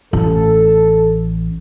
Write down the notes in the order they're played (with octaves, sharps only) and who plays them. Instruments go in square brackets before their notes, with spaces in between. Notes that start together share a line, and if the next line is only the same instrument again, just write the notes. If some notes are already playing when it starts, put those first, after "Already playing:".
[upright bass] A1 [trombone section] A4